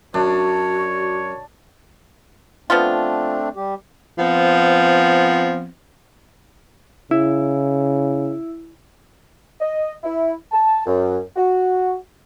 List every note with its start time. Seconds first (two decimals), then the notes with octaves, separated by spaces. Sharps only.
0.14 F#2 D4 F#4 C#5
2.70 F3 A3 B3 C4 D4 F4
3.56 G3 G4
4.18 F3 B3 C4
7.11 C#3 E4
9.61 D#5
10.04 E4
10.52 A5
10.86 F#2
11.36 F#4